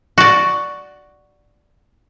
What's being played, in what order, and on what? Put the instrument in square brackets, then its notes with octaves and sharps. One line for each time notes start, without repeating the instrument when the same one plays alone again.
[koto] F#4 D5